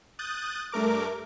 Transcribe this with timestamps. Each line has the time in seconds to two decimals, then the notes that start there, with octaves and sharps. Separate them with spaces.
0.19 D#6 F#6 G6 A6
0.72 G2 A3 A#4 D6